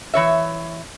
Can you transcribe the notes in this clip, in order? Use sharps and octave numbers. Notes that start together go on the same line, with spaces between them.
E3 C#5 E5